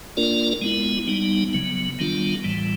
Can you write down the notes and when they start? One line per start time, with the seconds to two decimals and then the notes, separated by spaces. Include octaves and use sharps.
0.17 A#3 D4 F4 A#4 D5
0.62 G#3 B3 E4
1.08 G3 B3 D#4
1.53 C#3 F#3 B3
1.99 D#3 G3 B3 D4 F4
2.44 A2 E3 G3